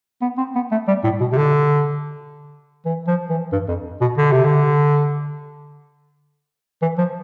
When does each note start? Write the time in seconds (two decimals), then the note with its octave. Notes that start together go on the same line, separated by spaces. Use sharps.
0.22 B3
0.38 C4
0.55 B3
0.71 A3
0.88 G3
1.04 A2
1.20 B2
1.32 C3
1.38 D3
2.86 E3
3.08 F3
3.29 E3
3.52 G2
3.68 F2
4.01 B2
4.18 D3
4.32 C3
4.45 D3
6.82 E3
6.98 F3